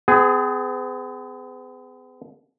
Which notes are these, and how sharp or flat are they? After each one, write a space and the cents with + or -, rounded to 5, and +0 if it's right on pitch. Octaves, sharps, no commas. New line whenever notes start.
B3 +45 G#4 +0